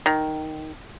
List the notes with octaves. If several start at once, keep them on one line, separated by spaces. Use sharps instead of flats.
D#3